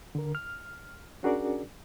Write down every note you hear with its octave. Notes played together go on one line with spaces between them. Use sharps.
D3 A#4
F6
C#4 D4 F#4 G#4 A#4 D5